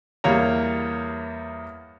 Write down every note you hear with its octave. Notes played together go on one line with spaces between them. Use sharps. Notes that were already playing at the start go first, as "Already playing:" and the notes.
E2 G3 A#3 C#5 A#5